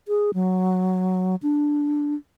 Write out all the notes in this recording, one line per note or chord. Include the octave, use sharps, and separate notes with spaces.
G#4
F#3
D4